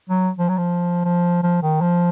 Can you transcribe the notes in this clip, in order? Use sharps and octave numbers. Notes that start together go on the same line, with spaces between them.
F#3
F3
F#3
F3
F3
F3
D#3
F3